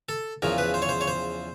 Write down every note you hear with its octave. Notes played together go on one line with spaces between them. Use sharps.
A4
E2 C#3 F3 A#4
B4
C5
C#5
C5
C#5
C5